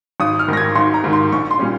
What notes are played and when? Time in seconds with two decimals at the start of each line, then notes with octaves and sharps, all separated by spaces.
0.20 G#1 D#6
0.39 F6
0.48 G#2 D#3 A#6
0.57 G#6
0.75 G#1 C6
0.94 A#5
1.04 G#2 D#3
1.13 C6
1.32 A#1 C#6
1.51 C6
1.59 A#2 G3 C#4